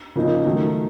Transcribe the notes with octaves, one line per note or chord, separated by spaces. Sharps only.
C#3 F3 A#3 D#4
D#3 F#3 A3